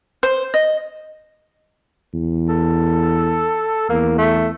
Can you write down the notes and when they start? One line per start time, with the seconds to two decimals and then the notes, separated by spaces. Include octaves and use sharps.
0.23 C5
0.54 D#5
2.13 E2
2.49 A4
3.90 E2 A#3
4.18 A3